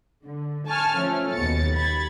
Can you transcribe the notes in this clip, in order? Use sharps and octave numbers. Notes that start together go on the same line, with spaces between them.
D3
G#5 A5 C#6 F6
F3 A3 C#4
D#2 B2 A6 C#7
B5 G#6 A6